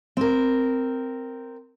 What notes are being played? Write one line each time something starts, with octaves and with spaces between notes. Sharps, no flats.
C4 A#4